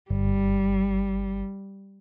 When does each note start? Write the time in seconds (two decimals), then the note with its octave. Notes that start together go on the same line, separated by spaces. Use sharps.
0.10 G1 G3